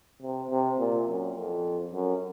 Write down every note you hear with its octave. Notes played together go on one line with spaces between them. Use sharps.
C3
C3
A#2
F#2
F2
F#2